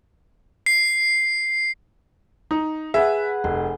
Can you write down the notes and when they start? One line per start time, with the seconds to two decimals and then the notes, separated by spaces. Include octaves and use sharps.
0.66 C7
2.51 D#4
2.94 G#4 B4 E5 F#5
3.44 F1 C6